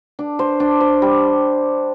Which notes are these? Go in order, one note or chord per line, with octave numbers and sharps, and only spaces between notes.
D4
C5
D4
C5
G3